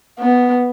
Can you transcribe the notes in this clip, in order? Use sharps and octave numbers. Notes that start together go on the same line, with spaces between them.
B3